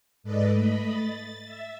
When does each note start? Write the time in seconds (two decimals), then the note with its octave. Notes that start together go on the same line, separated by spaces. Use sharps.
0.23 G#2 A4 B4 D5 D#5
0.53 A3 D#5 B5
0.89 A6
1.44 E5